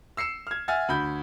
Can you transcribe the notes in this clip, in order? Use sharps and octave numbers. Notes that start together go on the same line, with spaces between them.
E6 C7 C#7 E7
F6 G#6
E5 F#5 G#5 F6 A6
D2 B5 G6